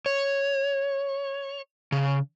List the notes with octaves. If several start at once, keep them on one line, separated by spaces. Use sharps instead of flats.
C#5
C#3